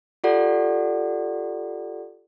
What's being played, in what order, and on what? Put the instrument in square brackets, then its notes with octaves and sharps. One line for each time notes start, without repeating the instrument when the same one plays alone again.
[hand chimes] F4 G4 A4 D5 F#5